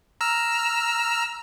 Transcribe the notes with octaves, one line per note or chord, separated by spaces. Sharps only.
A#5 E6 F6